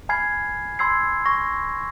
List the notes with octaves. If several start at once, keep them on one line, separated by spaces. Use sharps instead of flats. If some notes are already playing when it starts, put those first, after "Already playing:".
G#5 B5 F6 G#6 C7
B5 C6 E6 G#6 C7
C#6 A#6